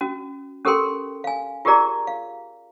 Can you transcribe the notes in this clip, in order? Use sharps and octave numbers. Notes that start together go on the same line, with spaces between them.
C#4 F#4
C#4 G4 A4 A#4 G5 C6
F5 G#5
F4 G4 G#4 A#4 D5 A#5
F5